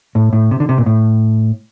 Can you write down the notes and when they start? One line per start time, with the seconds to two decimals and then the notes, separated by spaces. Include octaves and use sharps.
0.15 A2
0.33 A2
0.51 C3
0.60 D3
0.69 C3
0.78 A#2
0.86 A2